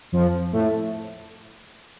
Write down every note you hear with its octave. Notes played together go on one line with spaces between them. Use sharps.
F2 F3
A2 A3